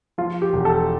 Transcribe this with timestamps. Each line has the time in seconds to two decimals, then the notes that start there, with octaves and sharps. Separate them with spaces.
0.18 F3 F4
0.42 G4
0.53 E1
0.65 A4